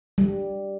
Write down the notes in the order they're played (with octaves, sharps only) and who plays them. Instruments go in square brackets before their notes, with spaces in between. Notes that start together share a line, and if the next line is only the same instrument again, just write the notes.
[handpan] G3